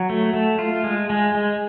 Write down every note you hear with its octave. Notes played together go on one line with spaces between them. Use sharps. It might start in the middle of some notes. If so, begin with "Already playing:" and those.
Already playing: F#3
A3
A3
F4
G#3
G#3
G#3